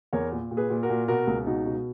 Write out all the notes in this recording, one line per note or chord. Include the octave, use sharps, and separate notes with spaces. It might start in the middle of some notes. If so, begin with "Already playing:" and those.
E2 A#4 C#5
A#2
A#2
G#4 B4
A#2
F#4 A#4
A#2
B2 F#4 A#4
C#2
B2 D#4 F#4
B2